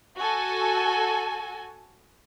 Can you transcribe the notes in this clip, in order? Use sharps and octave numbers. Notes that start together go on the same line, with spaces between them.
F#4 A4 G#5